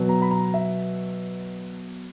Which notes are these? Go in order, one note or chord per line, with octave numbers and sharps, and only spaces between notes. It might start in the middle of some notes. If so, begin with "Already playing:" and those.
Already playing: B2 F#3 B3
A#5
B5
A#5
E5